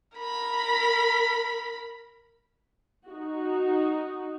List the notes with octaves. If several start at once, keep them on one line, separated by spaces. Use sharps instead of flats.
A#4 B5
D#4 F#4